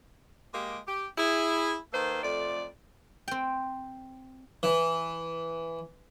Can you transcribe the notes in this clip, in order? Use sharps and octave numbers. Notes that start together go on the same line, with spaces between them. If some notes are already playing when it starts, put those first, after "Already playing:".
G#3 A#3 G4
G4
E4 G#4
D#3 A#3 A4 B4 C5
F2 A3 F4 D5
C4 G5
E3